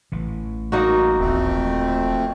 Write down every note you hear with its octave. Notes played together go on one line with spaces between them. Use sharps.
A1 E3
A#3 D#4 F#4
D#1 F2 A3 C4